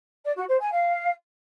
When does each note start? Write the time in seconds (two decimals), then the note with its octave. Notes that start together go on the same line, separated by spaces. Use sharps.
0.24 D5
0.36 F#4
0.48 C5
0.60 G#5
0.72 F5